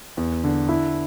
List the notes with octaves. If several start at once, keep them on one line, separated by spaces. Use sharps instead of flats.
E2
D3
E4